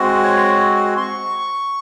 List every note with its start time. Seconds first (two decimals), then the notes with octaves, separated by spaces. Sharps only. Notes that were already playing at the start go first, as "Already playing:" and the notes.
Already playing: G#3 C4 F#4
0.23 C#5
0.97 C6
1.02 C#6